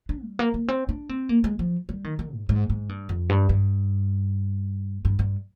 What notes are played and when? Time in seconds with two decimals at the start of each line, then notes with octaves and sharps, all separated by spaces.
0.09 D4
0.24 G3
0.39 A#3
0.54 A#3
0.68 C4
0.89 D4
1.09 C4
1.29 A#3
1.44 G#3
1.59 F3
1.89 G3
2.04 D#3
2.19 D#3
2.34 G#2
2.49 G#2
2.70 G#2
2.89 G2
3.09 F2
3.29 G2
3.49 G2
5.05 G2
5.19 G2